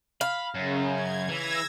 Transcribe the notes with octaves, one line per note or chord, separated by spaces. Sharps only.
F5 B5
F#2 C#3
G#6
E3 E6 G#6 A#6